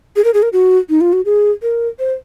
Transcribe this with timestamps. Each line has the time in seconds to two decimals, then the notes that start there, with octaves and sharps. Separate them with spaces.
0.16 G#4
0.24 A#4
0.34 G#4
0.43 A#4
0.53 F#4
0.90 D#4
1.01 F4
1.13 F#4
1.25 G#4
1.62 A#4
1.99 C5